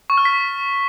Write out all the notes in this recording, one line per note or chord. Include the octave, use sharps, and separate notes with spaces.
C#6
F6
B6